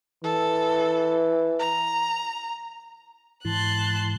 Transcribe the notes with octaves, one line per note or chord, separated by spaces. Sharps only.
E3 A4
A#5
G#2 E3 A5 C6 F#6